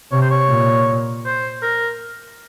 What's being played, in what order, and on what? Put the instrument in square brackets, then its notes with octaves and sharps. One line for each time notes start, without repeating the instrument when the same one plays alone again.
[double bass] C3 [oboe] C#5
[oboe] C5
C#5
[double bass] A#2
[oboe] C5
A#4